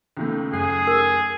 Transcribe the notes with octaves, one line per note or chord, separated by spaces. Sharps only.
C#2 D#3 A3
F#2 G#4 F#6 C7
A#4